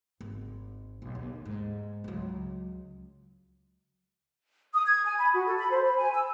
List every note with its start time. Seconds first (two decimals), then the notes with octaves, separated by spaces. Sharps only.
0.21 G#1
1.02 B1
1.15 D#2
1.45 G#2
2.04 C#2 F#3
4.73 D#6
4.86 G#6
5.06 G#5
5.19 B5
5.33 F#4
5.45 A4
5.58 B5
5.71 C5
5.84 B5
5.97 G#5
6.15 E6